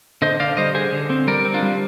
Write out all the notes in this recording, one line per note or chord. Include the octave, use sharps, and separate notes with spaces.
D3 C5 D#5
D3 D5 F5
G3 C5 D#5
D3 G#4 C5
D3
C4
G3 A#4 D5
C4
D4 F4
G3